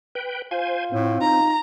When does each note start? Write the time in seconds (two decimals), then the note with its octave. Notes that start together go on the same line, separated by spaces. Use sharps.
0.15 B4 G5
0.51 F4 C5 G#5
0.92 A2 C4
1.21 D#4 A#5